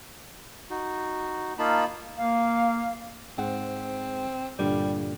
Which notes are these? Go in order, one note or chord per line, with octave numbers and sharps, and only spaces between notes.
D#4 F#4
A#3 D#4 F4 A5 B5
A#3 F5
G#2 C4 F#5
G2 A#2 D3 G3